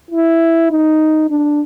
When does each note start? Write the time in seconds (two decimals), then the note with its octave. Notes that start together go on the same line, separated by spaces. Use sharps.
0.11 E4
0.71 D#4
1.30 D4